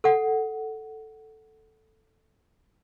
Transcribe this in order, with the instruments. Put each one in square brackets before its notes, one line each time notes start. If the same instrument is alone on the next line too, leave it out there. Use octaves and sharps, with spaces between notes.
[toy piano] A4 F#5